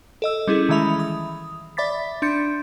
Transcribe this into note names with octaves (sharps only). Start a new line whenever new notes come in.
A4 D#5 E6
G3 C#4 E4 G#4
D#3 E3 G#3 E5 B5 F7
D#6
D5 E5 B5 D6 A6 B6
D4 C6 G6 A6 C#7